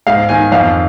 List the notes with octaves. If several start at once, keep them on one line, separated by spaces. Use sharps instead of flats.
G#2 F5
D#3 G#5
F2 F5